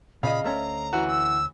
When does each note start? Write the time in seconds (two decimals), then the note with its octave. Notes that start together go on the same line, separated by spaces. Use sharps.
0.23 A#2 C#3 D#5 F5 B5
0.44 D2 A3 C#4 A#5
0.93 E3 F#4
1.08 E6